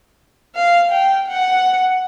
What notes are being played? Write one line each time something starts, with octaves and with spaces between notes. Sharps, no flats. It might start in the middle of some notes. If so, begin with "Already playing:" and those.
F5
G5
F#5